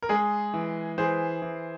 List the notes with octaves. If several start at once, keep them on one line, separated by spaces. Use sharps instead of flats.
A#4
G#3 G#4
E3
E3 G#4 C5
E3